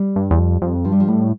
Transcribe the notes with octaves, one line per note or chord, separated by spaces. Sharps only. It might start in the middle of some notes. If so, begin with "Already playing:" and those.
Already playing: G3
G2
E2
F2
F2
G2 F3
G3
F3
A2 G3